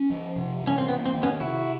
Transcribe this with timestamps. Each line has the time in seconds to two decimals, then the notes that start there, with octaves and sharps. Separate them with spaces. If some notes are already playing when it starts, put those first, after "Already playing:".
Already playing: C#4
0.10 F3
0.36 C3
0.62 E3
0.67 C#4
0.78 C4
0.88 A#3 B3
1.06 C4
1.14 D#3
1.23 B3 C#4
1.40 C3 E4 F#4